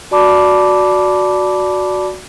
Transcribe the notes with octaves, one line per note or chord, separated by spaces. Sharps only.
F#4 D5 A5 B5 D6